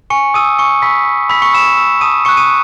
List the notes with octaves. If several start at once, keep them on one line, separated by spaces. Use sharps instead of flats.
G#5 C#6 C#7
C#6 D#6 E6 D#7
G#5 C#6 C#7
B5 C#6 E6 B6
B5
B5 E6 B6
C#6 C#7
B5 E6 E7
E6
A5 D#6 D#7
C#6 F#6 C#7
D#6 D#7